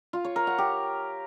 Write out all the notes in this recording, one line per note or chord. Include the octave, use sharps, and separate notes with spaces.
F4
C#5
A#4
F#5
G4